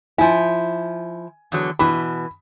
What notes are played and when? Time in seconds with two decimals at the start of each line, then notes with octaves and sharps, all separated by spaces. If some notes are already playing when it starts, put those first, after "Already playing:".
0.18 F3 E4 G#5
1.52 E2 D3 F#3
1.79 B2 E3 B5